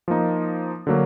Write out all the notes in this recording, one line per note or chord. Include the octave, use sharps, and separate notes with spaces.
F3 A#3 D#4
D3 F#3 A#3